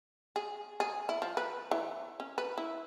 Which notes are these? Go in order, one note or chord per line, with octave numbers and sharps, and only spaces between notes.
G#4
G#4
E4
F3
B4
E3
C#4
B4
E4